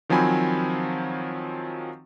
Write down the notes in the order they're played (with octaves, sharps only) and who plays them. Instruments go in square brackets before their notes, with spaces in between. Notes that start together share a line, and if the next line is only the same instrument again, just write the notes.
[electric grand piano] D#3 F3 F#3 C4 G#5 B5